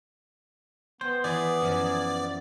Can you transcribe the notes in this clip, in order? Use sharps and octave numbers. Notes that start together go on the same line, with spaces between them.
B3 C5 G5
E3 G#4 B4 D5
F#2 E3 F3